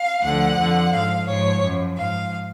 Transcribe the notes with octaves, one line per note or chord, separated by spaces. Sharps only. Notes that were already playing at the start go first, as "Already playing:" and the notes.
Already playing: F5
D2 D3 F3 F#5
F2 D3 F3
G#2 F3 F5
G#2 F3 C#5
F#2 F3
G#2 F3 F5